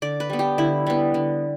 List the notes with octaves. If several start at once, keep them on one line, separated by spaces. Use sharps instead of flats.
D3 D5
B4
G3 B3
G4
D3 E4
G3 B3
D3